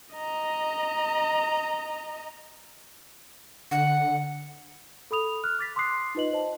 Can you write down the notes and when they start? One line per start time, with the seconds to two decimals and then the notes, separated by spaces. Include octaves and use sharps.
0.15 D#5 A#5
3.71 D3 F#5
5.11 A4 B5 D#6 F7
5.44 F6 F#6
5.59 D6 A6 B6
5.76 C6 D6 D#6 F#6 C7
6.15 D#4 F4 B4 D#5 F#7
6.32 C5 D#5 A5